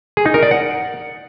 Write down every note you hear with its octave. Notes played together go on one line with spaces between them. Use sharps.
G#4
D#4
A#4
D5
F#5